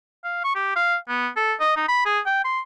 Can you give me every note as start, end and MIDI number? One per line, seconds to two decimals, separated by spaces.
0.24 0.44 77
0.44 0.53 85
0.55 0.75 67
0.76 0.96 77
1.09 1.28 59
1.37 1.53 69
1.60 1.74 75
1.77 1.85 63
1.89 2.01 83
2.06 2.20 68
2.26 2.44 79
2.45 2.60 84